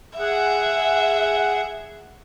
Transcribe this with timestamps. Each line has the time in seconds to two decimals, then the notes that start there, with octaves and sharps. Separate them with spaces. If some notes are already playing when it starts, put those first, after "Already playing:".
0.19 G#4 E5 F#5